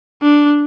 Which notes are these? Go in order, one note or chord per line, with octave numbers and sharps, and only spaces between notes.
D4